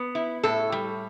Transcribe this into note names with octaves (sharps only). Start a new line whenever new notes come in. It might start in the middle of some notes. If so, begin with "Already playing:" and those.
Already playing: B3
E4
A2 A4
G3